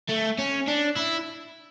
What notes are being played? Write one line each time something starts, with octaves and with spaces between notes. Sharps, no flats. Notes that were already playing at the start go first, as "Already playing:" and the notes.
A3
C#4
D4
E4